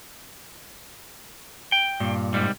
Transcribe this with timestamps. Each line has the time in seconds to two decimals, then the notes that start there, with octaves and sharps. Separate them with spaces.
1.72 G5
2.00 G2 A#2
2.34 C2 G#2 G3